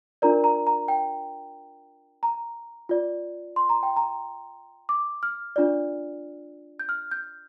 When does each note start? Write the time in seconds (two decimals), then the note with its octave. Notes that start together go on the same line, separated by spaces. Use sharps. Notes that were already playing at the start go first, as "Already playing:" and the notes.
0.22 D4 F4 A#4 D5 A#5
0.44 A#5
0.67 A#5
0.88 G5
2.23 A#5
2.89 F4 D5
3.56 C6
3.69 A#5
3.83 G5
3.96 A#5
4.89 D6
5.23 F6
5.56 D4 F4 D5
6.79 G6
6.89 F6
7.11 G6